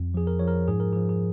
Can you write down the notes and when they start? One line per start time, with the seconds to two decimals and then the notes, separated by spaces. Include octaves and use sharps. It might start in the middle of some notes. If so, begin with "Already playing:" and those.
Already playing: F2
0.14 F3 G#4
0.27 A#4
0.39 F3 C#5
0.48 A#4
0.68 G#2 G#4
0.80 A#4
0.93 G#4
0.96 F3
1.09 G#4